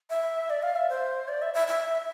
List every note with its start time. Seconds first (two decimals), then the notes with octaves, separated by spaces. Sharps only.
0.10 E5
0.50 D5
0.62 F5
0.76 E5
0.89 C5
1.28 D5
1.42 E5
1.54 E5
1.68 E5